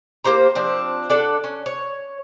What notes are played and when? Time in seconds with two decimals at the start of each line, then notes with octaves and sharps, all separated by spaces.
0.24 A#3 G4 C5 A#5
0.55 F3 C4 D4
1.10 D4 A4 F#5
1.44 C#4
1.66 C#5